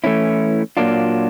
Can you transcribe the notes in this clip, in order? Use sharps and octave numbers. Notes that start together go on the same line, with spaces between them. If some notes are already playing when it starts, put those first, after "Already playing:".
E3 A3 C#4 E4
A#2 F#3 A#3 D4 F4